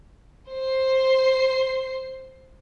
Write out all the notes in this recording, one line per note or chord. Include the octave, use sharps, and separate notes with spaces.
C5 C7